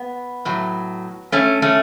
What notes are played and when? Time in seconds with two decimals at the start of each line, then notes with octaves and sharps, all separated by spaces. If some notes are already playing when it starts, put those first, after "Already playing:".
Already playing: B3
0.45 A2 F#3
1.32 A3 C#4
1.62 A3 C#4